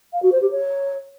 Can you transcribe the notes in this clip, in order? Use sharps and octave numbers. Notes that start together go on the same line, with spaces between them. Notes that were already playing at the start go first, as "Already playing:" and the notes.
F5
F#4
C5
G4
C#5